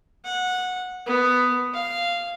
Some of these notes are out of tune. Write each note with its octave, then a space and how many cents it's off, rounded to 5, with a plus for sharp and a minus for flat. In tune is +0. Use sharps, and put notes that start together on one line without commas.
F#5 -15
B3 +10
F5 -10